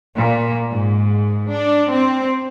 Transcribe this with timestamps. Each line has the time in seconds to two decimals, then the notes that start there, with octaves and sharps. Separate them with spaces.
0.17 A#2
0.70 G#2
1.51 D4
1.91 C4